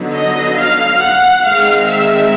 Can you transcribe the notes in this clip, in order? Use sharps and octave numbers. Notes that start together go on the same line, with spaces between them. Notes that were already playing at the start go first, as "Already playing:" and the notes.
Already playing: D3 F#3 B3 D#4
D#5
F5
F#5
D#3 G#3 C4 D#4 F5
E5